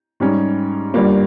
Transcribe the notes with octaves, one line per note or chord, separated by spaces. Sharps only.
G#2 G3 C#4
G1 G2 G3 A#3 F4